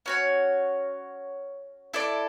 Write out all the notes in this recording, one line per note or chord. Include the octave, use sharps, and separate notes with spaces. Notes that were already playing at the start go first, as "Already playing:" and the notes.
C#4 F#4 C#5
E4 A4 D5